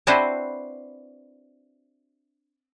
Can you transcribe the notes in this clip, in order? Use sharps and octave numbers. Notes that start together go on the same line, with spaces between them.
C4 D4 E4 F#4 B4 C5